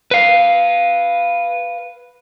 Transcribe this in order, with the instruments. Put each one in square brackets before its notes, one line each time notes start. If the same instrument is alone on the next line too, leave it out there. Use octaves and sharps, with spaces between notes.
[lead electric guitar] B4 F5